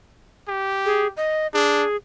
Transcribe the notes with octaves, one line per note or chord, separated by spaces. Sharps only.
G4
G#4
D#5
D4 G#4